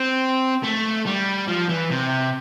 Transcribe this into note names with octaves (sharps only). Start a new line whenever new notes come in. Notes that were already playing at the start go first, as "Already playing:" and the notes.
Already playing: C4
A3
G3
F3
E3
C3